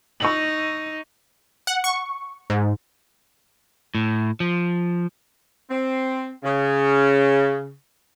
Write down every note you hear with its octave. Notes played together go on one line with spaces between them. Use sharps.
D#4 C#6 E6 F#7
F#5
C#6
G#2
A2
F3
C4
C#3